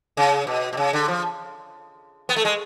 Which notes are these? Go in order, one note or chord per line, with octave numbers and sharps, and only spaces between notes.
C#3
B2
B2
C#3
D3
F3
B3
A3
G#3